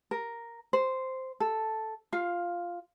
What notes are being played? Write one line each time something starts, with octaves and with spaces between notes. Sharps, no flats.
A#4
C5
A4
F4 F5